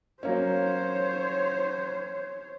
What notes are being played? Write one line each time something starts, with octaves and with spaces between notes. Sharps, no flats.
F#3 A#3 C#4 C5 C#5